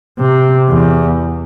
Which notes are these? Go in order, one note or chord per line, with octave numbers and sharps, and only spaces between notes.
C3
E2